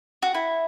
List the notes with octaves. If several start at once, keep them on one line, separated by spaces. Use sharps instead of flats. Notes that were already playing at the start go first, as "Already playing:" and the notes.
F#4
E4